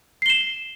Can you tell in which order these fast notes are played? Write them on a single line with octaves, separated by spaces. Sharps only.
C7 G7 E7